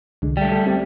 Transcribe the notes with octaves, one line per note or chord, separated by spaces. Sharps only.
C2 D3 G#3
G3 A3 G5
A4 G5
C4 G4